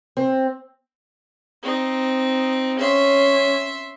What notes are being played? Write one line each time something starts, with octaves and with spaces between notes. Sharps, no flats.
C4
C4 D#4
C#4 E5 C6